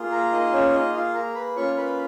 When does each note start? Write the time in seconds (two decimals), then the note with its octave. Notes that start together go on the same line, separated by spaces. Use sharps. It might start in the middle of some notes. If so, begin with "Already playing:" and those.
Already playing: A#3 F4 G#4
0.11 A#4 A#5
0.32 D#4 D#5
0.53 C#4 C#5
0.73 D#4 D#5
0.94 F4 F5
1.14 A#4 A#5
1.35 B4 B5
1.56 A#3 C#4 F4 C#5 C#6
1.77 B4 B5